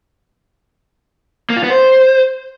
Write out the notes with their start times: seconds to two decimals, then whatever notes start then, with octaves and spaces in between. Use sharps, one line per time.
1.50 A#3
1.57 F4
1.63 B3
1.70 C5